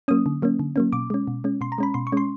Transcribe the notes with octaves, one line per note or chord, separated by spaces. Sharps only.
F#3 A#3 C#4 D#6
D3
F#3 A#3 C#4
D3
F#3 A#3 C#4
B2 D6
G#3 C#4
B2
G#3 C#4
B2 C6
A#5
G#3 C#4 B5
B2 C6
C#6
G#3 C#4 C6